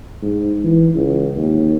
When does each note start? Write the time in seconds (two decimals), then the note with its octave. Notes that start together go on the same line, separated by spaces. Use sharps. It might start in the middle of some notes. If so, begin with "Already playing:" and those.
0.22 G#2
0.64 E3
0.95 C#2
1.36 D#2